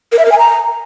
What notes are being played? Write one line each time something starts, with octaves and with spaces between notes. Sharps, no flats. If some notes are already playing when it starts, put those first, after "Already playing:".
A#4
E5
A#4
G#5
A#5